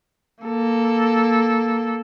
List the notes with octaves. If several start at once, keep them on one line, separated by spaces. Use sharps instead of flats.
A#3 A4